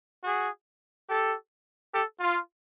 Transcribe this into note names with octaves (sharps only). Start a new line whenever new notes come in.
F#4 G#4
G4 A4
G4 A4
F4